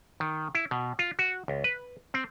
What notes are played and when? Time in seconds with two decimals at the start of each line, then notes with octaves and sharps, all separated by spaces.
0.20 D#3
0.55 E4
0.71 B2
0.99 F4
1.19 F#4
1.48 C#2
1.64 B4
2.14 C4